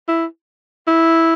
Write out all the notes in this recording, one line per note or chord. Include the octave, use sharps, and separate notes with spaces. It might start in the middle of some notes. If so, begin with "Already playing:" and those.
E4
E4